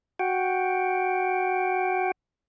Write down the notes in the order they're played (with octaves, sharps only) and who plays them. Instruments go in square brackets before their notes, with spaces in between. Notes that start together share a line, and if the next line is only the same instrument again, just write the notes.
[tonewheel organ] F#4 F#5 G5